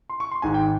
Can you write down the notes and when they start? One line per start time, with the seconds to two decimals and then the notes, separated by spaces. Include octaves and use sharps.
0.10 C6
0.20 C#6
0.31 C6
0.42 G#1 G#2 D#3 G#5
0.54 G5